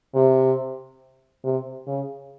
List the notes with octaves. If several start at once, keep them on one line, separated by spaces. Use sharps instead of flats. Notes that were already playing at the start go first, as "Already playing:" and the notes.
C3
C3
C#3